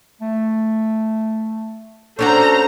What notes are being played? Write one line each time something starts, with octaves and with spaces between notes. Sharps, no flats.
A3
C#4 D4 F#4 A4 C5 A#5